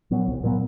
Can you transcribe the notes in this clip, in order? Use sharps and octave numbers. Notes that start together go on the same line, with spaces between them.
A#2 F#3 B3
C2
A#2 F#3 B3